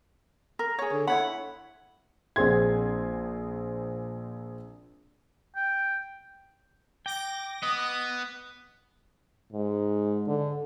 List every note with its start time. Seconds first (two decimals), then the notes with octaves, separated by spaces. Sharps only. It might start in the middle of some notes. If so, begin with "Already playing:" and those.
0.59 A#4
0.79 G#4 C#5
0.92 D3
1.07 E4 C#5 F#5 B5
2.36 A#1 C4 G#4 C6 G#6
5.56 G5
7.06 G5 D6 A#6
7.63 B3 D#5 D#6
9.53 G#2
10.28 D3